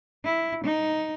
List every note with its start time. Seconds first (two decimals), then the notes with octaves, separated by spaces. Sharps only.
0.25 E4
0.64 D#4